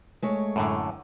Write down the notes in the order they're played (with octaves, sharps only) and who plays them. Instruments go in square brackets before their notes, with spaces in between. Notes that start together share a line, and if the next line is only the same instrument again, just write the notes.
[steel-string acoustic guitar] G#3 A3 C#5
[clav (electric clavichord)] F#2 A2 D3